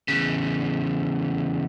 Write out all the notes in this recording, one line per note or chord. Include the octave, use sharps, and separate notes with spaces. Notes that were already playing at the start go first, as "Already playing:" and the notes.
E2 C#3